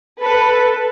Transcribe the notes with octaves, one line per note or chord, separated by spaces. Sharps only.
A4 B4